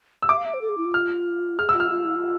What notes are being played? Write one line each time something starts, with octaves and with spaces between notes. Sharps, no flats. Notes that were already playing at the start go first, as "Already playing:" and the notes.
E6
E5 D6
F5
E5
C5
A4
G#4
E4
F4
F6
G#4 F6
E6
F4
F6
F4
E4
F4